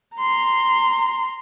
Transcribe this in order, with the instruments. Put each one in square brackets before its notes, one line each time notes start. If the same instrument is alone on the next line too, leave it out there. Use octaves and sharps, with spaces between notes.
[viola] A#5 C6